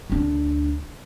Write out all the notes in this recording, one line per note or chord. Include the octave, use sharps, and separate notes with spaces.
D2 D4